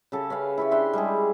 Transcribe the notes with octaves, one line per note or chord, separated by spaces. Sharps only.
C#3 G4 A4 A5
C#4 B4 F5
E4 G4 C#6
D4 G4 E5 C6
G3 G#3 C#4 G#4